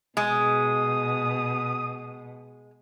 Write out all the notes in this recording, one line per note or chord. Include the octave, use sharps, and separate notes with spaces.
B2 G#3 D#6